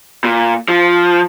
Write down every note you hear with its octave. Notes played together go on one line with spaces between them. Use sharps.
A#2
F3